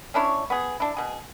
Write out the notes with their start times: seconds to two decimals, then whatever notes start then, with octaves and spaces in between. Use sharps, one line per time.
0.14 C#4 D4 E4 C#5
0.50 B3 G#4
0.80 D4 E4
0.97 B2 G#4